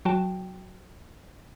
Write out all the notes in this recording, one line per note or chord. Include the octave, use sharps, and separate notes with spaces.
F#3 F#4 G5 A5